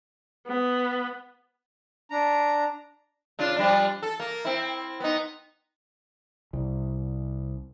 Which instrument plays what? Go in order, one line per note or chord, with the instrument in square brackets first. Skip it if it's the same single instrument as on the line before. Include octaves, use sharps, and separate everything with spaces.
[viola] B3
[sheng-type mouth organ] D4 A#5
[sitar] C#3 D4 F4
F3 G3 D4
A4
A#3
C4 E4
B3 D#4
[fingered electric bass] C2